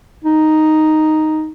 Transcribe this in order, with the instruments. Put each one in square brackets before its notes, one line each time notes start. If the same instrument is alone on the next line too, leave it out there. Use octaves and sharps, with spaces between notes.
[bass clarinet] D#4